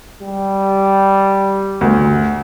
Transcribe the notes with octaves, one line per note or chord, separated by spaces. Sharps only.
G3
D2